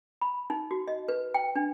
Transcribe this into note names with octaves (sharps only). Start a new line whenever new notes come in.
B5
D#4
F#4
D#5
B4
G5
D4